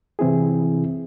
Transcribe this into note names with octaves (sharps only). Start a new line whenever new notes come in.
C3 E3 C4 E4 G#4